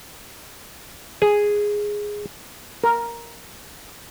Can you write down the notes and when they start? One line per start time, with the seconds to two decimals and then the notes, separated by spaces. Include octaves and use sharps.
1.22 G#4
2.84 A#4